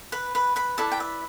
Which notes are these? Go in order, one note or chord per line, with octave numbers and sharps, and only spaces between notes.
B4 B5
B4 B5
B4 B5
E4 A4 B4 D5 A5
G5
E5